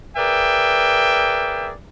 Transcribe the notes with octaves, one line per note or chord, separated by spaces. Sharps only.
G#4 A#4 B4 D5 E5 G5